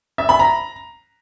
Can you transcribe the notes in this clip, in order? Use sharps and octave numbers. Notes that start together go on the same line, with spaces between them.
E5
B5
A#5